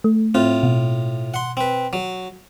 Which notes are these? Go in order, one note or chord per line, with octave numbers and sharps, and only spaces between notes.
A3
A2 C4 F4
B2
F#5 C6
C4 B4
F#3